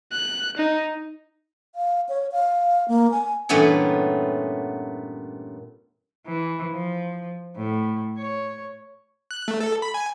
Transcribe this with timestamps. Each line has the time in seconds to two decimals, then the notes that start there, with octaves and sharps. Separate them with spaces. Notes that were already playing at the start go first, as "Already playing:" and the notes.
0.12 F#6
0.57 D#4
1.75 F5
2.09 C#5
2.32 F5
2.88 A#3
3.11 G#5
3.49 G2 A#2 E3 A3 B3 C#4
6.27 E3
6.74 F3
7.57 A2
8.19 C#5
9.31 F#6
9.48 A3
9.60 A4
9.82 B5
9.94 G#5